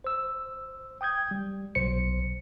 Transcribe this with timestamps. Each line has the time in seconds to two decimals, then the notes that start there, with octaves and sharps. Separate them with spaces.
0.04 C5 E6
1.01 G5 D#6 G6 G#6
1.31 G3
1.75 B1 C5 C#7